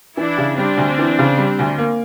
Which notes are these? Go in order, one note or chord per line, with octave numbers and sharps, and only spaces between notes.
E3 D4 E4
C#3
G3 C4 D4
D2
E3
C#3
G3
D2
A#3